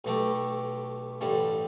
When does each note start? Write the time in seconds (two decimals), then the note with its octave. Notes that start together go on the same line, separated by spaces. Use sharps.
0.04 B1 B2 A3 G4
1.21 A1 G2 D3 G3